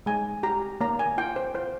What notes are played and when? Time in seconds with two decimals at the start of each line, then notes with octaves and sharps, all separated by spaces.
0.06 G#3 G#5
0.43 G4 A#5
0.81 A#3 A#5
0.99 G#5
1.18 F4 G5
1.36 C5
1.54 F4 C5